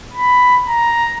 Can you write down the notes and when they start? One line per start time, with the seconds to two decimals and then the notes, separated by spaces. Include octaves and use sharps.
0.13 B5
0.68 A#5